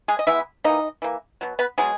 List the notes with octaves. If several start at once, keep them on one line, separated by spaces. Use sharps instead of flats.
G#3 G#4
D#5
E3 G#3 B3 E4 E5
E3 A#3 D#4 D#5
E3 A#3
B2 F#3
B3 B4
B2 F#3 G#3 B3 G#4